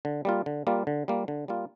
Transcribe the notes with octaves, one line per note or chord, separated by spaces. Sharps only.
D3
G3 A#3 F4
D3
G3 A#3 F4
D3
G3 A#3 F4
D3
G3 A#3 F4